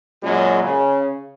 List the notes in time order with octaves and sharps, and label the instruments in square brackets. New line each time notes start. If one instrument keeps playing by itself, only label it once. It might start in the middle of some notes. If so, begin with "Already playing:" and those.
[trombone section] F#2 A#2 C#3 F#3 G#3
C#3